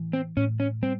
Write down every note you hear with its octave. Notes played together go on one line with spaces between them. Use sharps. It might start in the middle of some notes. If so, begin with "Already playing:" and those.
Already playing: A2 E3
C4
A2 C#4
C#4
G3 C4